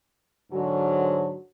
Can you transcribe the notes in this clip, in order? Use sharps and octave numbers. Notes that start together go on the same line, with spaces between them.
G#2 D3 F#3